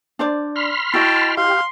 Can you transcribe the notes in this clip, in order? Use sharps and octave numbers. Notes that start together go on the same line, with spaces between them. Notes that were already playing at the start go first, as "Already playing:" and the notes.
D4 C5 D5
B5 C6 F6
E4 F#4 D#5 G5 A5
G4 F5 C6